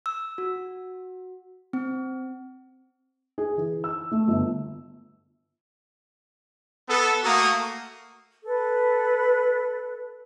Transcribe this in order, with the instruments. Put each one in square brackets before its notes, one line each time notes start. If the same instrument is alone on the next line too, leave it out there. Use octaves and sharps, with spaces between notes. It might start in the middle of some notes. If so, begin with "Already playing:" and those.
[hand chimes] E6
F#4
C4
[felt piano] G#4
E3
E6
A3
G1
[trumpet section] B3 A4
A3 A#3 F#4 F5 A#5 D#6
[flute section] A4 B4